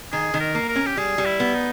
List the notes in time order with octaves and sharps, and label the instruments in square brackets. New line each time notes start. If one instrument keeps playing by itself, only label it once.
[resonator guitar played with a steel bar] D#3 [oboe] G#4
[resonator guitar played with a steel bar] D#3
[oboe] A#4
[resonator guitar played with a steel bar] A#3
[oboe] A#4
[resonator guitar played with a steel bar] C#4
[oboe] G4
[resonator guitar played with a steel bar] G3 [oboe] G#4
[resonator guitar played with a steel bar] G3
[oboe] E4
[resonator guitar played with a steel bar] B3
[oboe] D#4